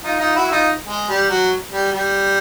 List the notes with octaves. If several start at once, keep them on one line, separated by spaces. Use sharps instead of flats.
D#4 F4
D#4 F4
E4 F#4
D#4 F4
G#3
G3
F#3
G3
G3